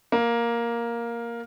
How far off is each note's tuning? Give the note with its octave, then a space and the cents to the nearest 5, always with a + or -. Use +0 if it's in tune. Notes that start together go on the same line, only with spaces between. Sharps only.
A#3 +5